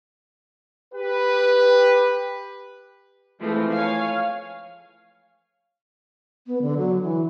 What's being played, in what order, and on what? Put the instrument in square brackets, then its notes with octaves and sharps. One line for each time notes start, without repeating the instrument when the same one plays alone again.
[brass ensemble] G4 B4
[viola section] E3 F3 G#3 A3 C4
C#5 F5 G#5
[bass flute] B3
D3
F#3
E3